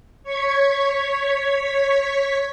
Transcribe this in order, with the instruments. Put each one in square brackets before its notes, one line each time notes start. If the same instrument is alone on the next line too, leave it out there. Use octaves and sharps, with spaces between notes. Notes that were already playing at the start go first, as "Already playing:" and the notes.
[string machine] C#5 C#6 G#6 B6